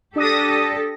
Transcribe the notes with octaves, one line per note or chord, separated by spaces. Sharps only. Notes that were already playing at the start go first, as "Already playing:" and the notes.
D4 G4 A4 D#6 A#6